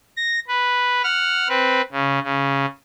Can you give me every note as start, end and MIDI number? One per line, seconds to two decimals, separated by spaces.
0.17 0.40 94
0.48 1.02 71
1.03 1.48 78
1.03 1.48 89
1.49 1.81 60
1.49 1.81 71
1.92 2.19 49
2.23 2.66 49